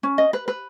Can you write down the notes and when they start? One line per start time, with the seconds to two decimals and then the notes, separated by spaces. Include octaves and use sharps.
0.03 C#4
0.18 D#5
0.33 B4
0.48 B4